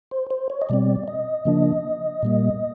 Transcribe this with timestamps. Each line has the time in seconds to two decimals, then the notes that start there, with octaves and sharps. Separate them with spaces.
0.11 C5
0.30 C5
0.50 C#5
0.62 D#5
0.69 B2 G3 C4 D5
1.08 D#5
1.45 C#3 F3 A#3 D4
2.23 A#2 G3 A#3